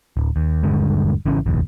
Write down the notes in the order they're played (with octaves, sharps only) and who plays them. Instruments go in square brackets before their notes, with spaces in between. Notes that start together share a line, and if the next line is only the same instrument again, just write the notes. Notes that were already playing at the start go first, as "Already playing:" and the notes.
[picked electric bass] D1
D#2
D#1 G2 D3 G#3
G#1 C#3 E3 C#4
F1 A#1 D#2